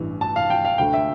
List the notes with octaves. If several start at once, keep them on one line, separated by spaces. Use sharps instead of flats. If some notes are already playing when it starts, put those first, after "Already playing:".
Already playing: A1 G2 E3
A5
F5
G5
F5
D2 D3 A3 G5
E5